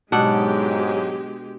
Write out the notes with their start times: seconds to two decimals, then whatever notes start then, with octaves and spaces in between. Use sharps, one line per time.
0.12 G#2 B2 F#3 G#3 D4 G4 F#5